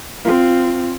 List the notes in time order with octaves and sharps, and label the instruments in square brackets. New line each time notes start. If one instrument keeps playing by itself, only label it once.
[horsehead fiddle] C4 F4